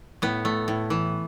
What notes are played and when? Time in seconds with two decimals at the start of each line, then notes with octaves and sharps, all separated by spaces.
0.22 A2 B3
0.45 A3
0.68 A2
0.90 E3